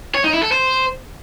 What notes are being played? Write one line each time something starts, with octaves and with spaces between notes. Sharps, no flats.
C#5
D#4
E4
A4
C5